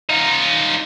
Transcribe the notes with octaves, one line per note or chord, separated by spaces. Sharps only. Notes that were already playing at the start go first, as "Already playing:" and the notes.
D#4 F4